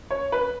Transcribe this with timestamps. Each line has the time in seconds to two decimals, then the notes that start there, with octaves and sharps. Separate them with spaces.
0.11 C#5
0.32 B4